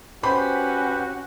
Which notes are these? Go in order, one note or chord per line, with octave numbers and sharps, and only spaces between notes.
C#4 F#4 G4 B4 C5 B5